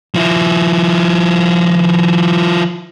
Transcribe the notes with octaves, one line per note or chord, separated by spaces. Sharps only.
F3 E4